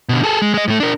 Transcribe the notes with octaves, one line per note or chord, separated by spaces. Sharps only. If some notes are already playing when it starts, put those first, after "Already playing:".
B2 D3
G#4 A4
G#3
G#3 D#5
A2 A3
D4 A#4